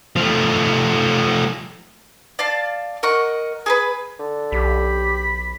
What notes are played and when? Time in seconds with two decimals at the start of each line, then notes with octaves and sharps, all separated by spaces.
0.16 F3 A3
2.39 D5 F5 A5
3.03 A#4 D#5 F#5 C#6
3.66 G#4 A#4 B4
4.19 D3
4.52 B1 G4 B5